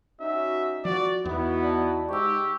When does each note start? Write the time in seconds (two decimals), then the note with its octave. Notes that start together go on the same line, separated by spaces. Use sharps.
0.21 C#4 D#4 F#4 E5
0.85 G#1 F3 F#4 D5
1.25 E2 B3 D#4 E4 F#4
1.63 D5 A5
2.09 G#2 G4 C#6 E6